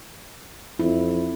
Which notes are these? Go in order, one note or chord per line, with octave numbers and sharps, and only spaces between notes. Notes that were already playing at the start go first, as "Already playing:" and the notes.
F2 E4